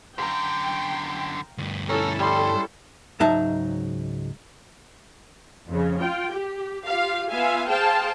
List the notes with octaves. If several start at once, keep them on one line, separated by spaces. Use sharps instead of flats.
F#2 D3 F5 G5 A#5
D2 G2
C#4 D#4 E4 A4
G3 C#5 C6
C#2 G#2 F#3 D#4 E5 A5
F2 C#3
F4 G5
G4
F4 G4 F5
B3 F4 E5 F5 G#5
G#4 C5 F5 G5 A5